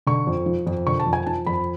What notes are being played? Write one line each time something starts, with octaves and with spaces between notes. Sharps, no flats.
D3 C#6
F2
F3
F2
D3 C#6
A5
F2
G#5
F3 A5
F2 B5